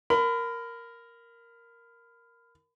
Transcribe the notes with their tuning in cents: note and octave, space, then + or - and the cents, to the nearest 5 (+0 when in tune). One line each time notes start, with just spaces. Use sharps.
A#4 +0 B5 +30